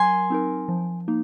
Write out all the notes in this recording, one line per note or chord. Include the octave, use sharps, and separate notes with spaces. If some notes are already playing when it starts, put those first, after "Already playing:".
Already playing: F#3 A#4 G#5 C6
C4 D#4 A#4
F3
A#3 D#4